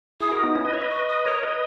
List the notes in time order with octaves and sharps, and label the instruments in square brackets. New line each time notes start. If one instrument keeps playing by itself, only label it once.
[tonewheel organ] E4 G#4 [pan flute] D#6
[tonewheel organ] F#4 A#4
B3 D#4
C#4 E4
B4 D#5
C#5 E5
B4 D#5
[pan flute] C#6
D#6
[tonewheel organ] A#4 C#5 [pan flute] D#6
[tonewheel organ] B4 D#5